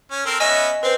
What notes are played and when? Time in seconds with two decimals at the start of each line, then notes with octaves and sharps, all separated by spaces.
0.11 C#4
0.26 C4 A4 A#4
0.40 B3 C#4 D#5 E5 G#5 A#6
0.83 C4 B4 C5